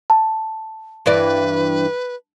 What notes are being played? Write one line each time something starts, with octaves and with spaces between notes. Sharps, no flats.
A5
G2 E3 B4 D5